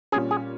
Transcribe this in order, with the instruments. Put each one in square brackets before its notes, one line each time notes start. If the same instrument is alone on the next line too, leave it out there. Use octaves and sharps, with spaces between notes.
[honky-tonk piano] A#2 G3 C#4 [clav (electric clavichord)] G#4
[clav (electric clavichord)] G#4